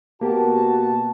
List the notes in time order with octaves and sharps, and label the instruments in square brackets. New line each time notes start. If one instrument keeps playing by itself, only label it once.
[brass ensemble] B2 F#4 A5 [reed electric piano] A#3 G4